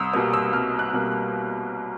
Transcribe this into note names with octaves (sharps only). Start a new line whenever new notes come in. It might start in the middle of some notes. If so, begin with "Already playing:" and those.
Already playing: C2 D#6 E6
B2 G3 A#3 D#6
E6
C2 F6
F#6
B2 G3 A#3